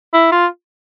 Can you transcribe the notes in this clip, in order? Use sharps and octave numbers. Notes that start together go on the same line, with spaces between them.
E4
F4